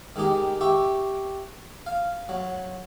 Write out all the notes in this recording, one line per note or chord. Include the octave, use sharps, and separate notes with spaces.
D#3 G#3 D#4 G4
G4 E5 C#6
F5
F#3